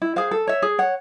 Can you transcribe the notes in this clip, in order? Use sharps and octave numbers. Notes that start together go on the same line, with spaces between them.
E4
G#4 C5 F5
A4
C#5 E5
G#4
C#5 F#5